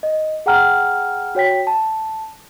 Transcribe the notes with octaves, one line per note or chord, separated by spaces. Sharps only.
D#5
G#4 F#5 G5 A#5 F6
F#4 C#5 G5 B6
A5